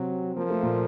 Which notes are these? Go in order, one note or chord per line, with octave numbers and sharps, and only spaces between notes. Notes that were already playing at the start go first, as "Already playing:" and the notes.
Already playing: C3 F#3 C4
F3 A#3
A3
A#2 A#3